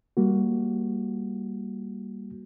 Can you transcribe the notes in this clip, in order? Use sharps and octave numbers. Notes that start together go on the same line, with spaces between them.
G3 A#3 F#4